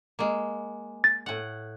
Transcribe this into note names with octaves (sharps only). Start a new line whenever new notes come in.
G#3 A#3
A6
A2 F#5